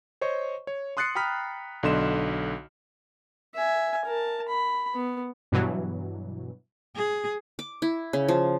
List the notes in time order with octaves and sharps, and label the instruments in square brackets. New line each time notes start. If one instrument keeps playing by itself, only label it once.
[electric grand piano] C5 C#5 D#5 C#6
C#5
C6 D#6 F#6 A6 C7 C#7
G5 A#5 B5 D#6 F6 B6
B1 D3 D#5 C6 E7
[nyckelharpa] E5 G#5
A#4 A5
B5
B3
[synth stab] G2 B2 E3 F#3
[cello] G#4
[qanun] D6
E4
C#3
F3